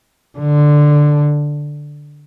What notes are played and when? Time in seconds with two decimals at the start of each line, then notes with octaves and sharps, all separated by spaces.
0.39 D3